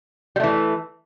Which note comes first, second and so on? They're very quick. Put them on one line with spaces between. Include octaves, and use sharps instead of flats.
G3 A3 E3